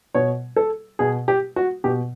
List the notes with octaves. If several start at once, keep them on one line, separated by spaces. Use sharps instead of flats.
B2 C#5
A4
B2 G#4
G4
F#4
B2 G4